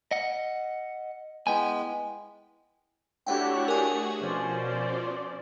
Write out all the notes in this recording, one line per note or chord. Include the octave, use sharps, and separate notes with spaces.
D#5 F#5
G#3 B3 E4 G5 G#5
A3 D4 E4 F#4 G4 C#5 F#5 G5
A3 F#4 G#4 A#4 G#5
B2 F3 C#4 C5 D5